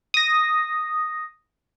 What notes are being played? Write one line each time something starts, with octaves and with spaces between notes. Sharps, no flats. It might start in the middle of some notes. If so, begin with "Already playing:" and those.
D#6 A#6